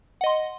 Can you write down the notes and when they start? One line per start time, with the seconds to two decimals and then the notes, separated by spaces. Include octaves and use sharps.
0.21 F#5
0.24 D#5
0.26 C6